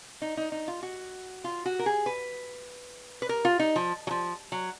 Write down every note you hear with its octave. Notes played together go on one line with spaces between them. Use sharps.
D#4
D#4
D#4
F4
F#4
F4
F#4
A#4
G#4
B4
B4
A#4
F4
D#4
F3
F#3
F3
F#3